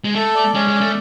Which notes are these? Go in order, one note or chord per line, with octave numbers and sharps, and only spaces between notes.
G#3
A3 A4
D5
G#3 C#4
G#3
D5
A3